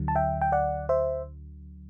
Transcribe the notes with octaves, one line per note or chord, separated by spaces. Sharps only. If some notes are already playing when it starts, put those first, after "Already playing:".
Already playing: D2 D3 F#3
A5
E5 G5
G5
D5 F#5
C5 E5